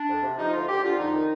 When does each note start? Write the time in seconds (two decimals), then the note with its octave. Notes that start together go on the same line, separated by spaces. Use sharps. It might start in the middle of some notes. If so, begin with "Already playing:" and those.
Already playing: D4
0.08 F2
0.22 C3
0.38 F3 D#4
0.53 D2 F4
0.68 D2 G4
0.83 D3 F4
0.98 F2 D#4
1.13 D#3